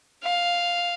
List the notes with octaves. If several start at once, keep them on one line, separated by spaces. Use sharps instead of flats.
F5